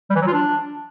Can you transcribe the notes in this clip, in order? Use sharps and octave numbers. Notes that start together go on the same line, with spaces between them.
G3
E3
F#3
F4
D4